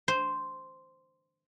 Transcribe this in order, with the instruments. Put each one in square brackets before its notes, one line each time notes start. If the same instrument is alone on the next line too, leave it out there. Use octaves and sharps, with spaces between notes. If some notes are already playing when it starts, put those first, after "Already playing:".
[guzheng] C5